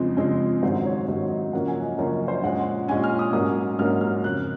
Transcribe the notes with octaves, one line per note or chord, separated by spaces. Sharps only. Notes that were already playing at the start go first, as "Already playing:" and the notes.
Already playing: F2 C#3 F3 G#3 C4
F2 C#3 F3 G#3 C4
G#2 D#3 F#3 C5
C#5
G#2 D#3 F#3 C#5
D#5
F#2 C#3 F3 A#3 C#4 F#5
G#5
D#5
F#2 C#3 F3 A#3 C#4 C#5
D#5
C5
A#2 G#3 C#4 F#5
A#2 G#3 C#4 G#5
F6
D#6
G#2 F#3 A#3 C#4 D#6
G#2 F#3 A#3 C#4 F6
F6
F2 C#3 F3 F#6